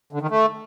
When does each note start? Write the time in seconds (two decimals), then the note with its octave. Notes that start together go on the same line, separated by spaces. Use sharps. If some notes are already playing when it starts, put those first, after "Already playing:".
0.13 D3
0.21 D#3
0.30 A3